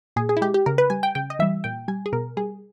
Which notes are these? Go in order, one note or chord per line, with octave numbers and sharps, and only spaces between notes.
A#2 G#4
G#4
E4
G#3 G4
G4
C#3 A#4
B4
G3 G#5
G5
C#3 G5
D#5
E3 G3 E5
A#2 G5
G3 G#5
G#4
B2 A#4
G3 G#4